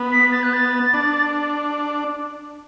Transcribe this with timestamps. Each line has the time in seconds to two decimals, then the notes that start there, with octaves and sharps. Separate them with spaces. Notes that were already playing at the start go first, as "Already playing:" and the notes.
Already playing: B3
0.12 B6
0.32 A6
0.43 F#6
0.53 A6
0.94 D4